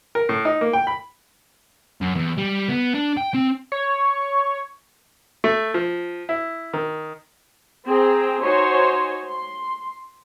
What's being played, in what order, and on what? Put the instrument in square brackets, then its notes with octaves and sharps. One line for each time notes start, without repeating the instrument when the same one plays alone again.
[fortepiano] A#4
A2
D#4
A#3
G5
B5
[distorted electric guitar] F#2
E2
G3
B3
D4
G5
C4
[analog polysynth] C#5
[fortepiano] A3
F3
E4
D#3
[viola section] C4 G#4 C5 G5 A#5
D#4 F#4 C5 C#5 G#5 C6
C6